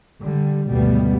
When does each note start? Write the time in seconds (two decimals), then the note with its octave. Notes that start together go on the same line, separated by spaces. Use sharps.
0.21 D3 G3
0.69 G#1 D2 B2 G3 A3 B3